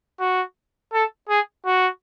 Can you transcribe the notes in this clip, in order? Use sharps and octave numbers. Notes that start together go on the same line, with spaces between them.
F#4
A4
G#4
F#4